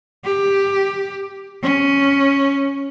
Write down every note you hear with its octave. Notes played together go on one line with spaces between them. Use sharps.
G4
C#4